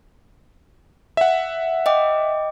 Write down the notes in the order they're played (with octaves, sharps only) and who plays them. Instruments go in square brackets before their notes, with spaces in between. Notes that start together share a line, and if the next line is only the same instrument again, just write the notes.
[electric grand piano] E5 F#5
[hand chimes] D#5 G5 D6